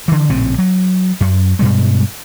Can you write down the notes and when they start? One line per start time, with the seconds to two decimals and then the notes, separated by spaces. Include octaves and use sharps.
0.08 D3 E3
0.29 A#1 A2 C#3 C4
0.58 F#3
1.21 F#2
1.59 G2 B2 G3 G#3